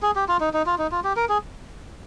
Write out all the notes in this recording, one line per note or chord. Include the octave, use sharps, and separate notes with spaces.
G#4
G4
F4
D#4
D#4
F4
D#4
F4
G4
A#4
G#4